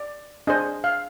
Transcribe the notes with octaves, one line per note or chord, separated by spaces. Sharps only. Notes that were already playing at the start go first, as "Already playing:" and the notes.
Already playing: D5
D4 G#4 C5 D#5
F5